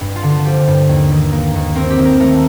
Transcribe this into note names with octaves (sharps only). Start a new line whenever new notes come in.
G2
F4
D3
F4
F3 G4
G2
D#2
D#3
A#3
D#2
C4 A#4
G4
D#3
A#4
A3 A#4